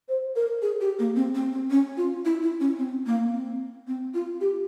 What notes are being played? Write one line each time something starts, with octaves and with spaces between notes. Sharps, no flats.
C5
A#4
G#4
G4
A#3
C4
C4
C4
C#4
F4
E4
E4
C#4
C4
A#3
C4
C4
F4
G4